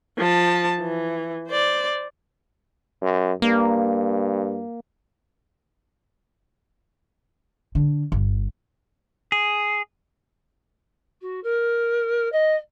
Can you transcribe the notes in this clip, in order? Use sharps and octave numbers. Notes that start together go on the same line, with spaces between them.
F3 A5
E3
C5 D5
F#2
G2 A#3
D3
G1
G#4
F#4
A#4
D#5